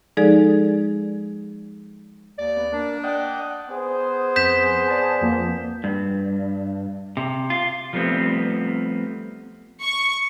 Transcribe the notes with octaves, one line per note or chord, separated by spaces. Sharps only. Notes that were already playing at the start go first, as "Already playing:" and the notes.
F3 G#3 D#4 G#4 A4 D5
D#2 D5
B3
A#3 D4
D5 D#5 F#5 G5
B3 G#4 C5
F2 G6 B6 E7
D5 A5
F2 F3 A#3
G2
C3
F4
F3 G3 A3 B3 C4
C#6